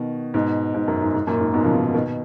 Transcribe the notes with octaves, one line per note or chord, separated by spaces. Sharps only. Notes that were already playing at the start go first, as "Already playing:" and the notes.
Already playing: B2 D#3
G#2 B2
G#2
F#2
G#2
G#2
F#2 A#2
G#2
G#2 B2
C#3 F3
G#2 B2
B2 D#3